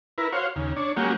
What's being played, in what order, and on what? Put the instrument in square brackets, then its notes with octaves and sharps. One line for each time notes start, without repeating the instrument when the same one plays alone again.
[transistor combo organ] E4 A#4 B4
F#4 C5 C#5 F5
D#2 C#3
D4 C#5
F#3 G#3 A#3 C#4 F#4 G4